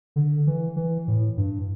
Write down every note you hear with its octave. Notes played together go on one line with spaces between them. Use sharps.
D3
E3
E3
A2
G2